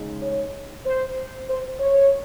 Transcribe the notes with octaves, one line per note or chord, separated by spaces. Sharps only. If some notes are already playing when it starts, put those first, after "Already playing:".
Already playing: C#3 G#3 D#4
C#5
C5
C5
C#5